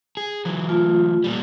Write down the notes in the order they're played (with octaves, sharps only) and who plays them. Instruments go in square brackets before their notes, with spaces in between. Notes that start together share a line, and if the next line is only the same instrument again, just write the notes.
[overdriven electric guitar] G#4
E3 F#3
[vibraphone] A3 F4
[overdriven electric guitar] A#2 G3